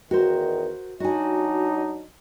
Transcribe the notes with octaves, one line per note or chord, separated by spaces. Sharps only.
E2 D#3 F#4 A#4 C5
F#3 D4 D#4 F#4 G#5